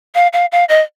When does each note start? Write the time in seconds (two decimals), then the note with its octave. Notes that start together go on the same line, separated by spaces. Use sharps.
0.15 F5
0.33 F5
0.52 F5
0.69 D#5